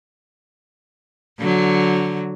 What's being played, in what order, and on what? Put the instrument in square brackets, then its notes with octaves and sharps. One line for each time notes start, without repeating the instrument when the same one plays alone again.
[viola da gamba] D3 F#3